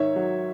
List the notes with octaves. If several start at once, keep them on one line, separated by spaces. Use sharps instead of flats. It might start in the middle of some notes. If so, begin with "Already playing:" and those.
Already playing: G#2 D#3 C#5 E5
F#3